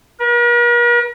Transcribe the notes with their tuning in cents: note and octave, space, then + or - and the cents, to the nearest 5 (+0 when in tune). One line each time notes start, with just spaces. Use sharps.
A#4 +45